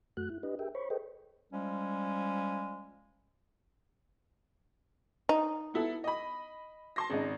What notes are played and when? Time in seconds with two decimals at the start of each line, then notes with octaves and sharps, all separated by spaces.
0.17 F#2 A3 F#4 F#6
0.30 E4
0.43 D4 G4 B4 D#5
0.59 G4 G#4 A#4 E5 G5
0.75 C5 C#5 B5 C#6
0.90 G#4 A4 B4 C5 D#5 G5
1.53 F3 G3 G#3 C#4
5.29 D#4
5.74 B3 E4 A4
6.04 D#5 B5
6.96 A5 C6 A#6
7.10 G#1 C#3 D#4